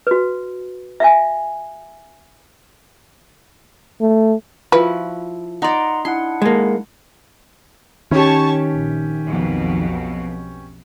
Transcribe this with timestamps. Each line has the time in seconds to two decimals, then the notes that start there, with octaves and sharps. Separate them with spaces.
0.07 F#4 B4
1.00 E5 F5 G#5
4.01 A3
4.72 F3 E4 F#4 B4
5.62 D#4 D5 F#5 A#5 C6
6.05 D4 E4 F#5 C6
6.42 G#3 A#3
8.11 D#3 C#4 G4 C#5 A5 C#6
8.71 A#1
9.25 B1 F2 B2